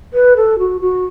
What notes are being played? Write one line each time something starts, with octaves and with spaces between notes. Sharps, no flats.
B4
A4
F#4
F#4